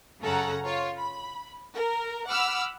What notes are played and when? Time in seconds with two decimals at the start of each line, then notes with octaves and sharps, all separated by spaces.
0.21 F#2 C#3 C#4 A4 F#5 A#5
0.65 F4 C#5
0.99 B5
1.76 A#4
2.29 F#5 B5 D6 E6 F6